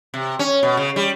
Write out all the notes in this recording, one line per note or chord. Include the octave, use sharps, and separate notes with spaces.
C3
C#4
B2
C#3
G3